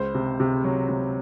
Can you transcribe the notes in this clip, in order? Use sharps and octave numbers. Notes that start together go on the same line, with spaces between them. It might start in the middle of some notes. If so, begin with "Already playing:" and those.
Already playing: C#2 C5
C3
C3
F#3
C3